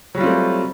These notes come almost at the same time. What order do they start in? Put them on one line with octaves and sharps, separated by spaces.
F#3 G3 F4 C4 A3